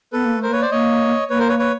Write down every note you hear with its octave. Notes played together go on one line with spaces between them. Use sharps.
B3 A4 B4
A#3
A3
A#4 C5
A#3 B4 C#5
C5 D5
A#3 C#5 D#5
A#3 B4 C#5
A#4 C5
B4 C#5
B4 C#5